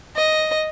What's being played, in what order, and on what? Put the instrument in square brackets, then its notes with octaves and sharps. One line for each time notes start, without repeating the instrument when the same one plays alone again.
[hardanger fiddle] D#5